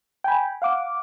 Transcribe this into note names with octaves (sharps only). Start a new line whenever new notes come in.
G5 G#5 B5
F5 F#5 D6